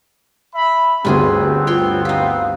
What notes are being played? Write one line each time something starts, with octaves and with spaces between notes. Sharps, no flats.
E5 B5
G1 D2 G2 B3 C4 D4 F4 G#4
F4 C#5 G5 C6
D#4 G4 F5